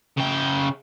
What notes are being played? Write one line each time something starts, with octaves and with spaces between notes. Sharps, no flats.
C#3 G5